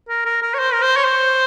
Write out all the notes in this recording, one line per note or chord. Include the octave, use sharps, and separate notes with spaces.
A#4
A#4
A#4
C#5
C5
A#4
C5
C#5
C5